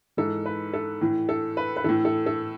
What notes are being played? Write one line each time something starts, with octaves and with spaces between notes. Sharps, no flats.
G#2 E3 A4
B4
A4
A2 E3
A4
B4
B4
A2 E3 A4
A4
A4